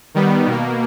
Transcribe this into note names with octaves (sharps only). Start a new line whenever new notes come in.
D#3 G3 B3
B2 A#3